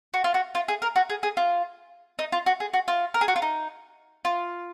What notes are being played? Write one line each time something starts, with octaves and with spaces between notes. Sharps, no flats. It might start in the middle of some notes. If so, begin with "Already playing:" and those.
F#4
F4
F#4
F4
G#4
A#4
F#4
G#4
G#4
F4
D#4
F4
F#4
G#4
F#4
F4
A#4
G#4
F#4
F4
D#4
F4